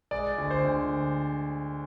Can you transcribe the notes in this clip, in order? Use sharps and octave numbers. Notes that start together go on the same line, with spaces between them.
G#3 D5
D2
C5
D2